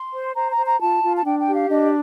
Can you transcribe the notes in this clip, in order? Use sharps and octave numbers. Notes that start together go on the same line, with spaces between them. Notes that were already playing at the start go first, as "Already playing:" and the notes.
Already playing: C6
C5
C5 A#5
A#5
C5
A#5
F4 A5
F4
A5
D4 G5
G5
G4
F5
D4 D#5